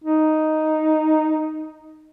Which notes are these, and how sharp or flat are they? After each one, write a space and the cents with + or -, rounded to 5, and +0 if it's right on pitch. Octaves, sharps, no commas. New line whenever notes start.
D#4 +0